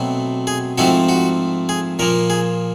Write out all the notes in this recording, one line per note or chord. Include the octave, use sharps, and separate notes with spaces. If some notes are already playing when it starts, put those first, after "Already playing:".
Already playing: B2 F#3 A3 C4
G#4
G#2 F3 A3 C4 F#4
F#4
G#4
A#2 F3 A#3 A#4
G#4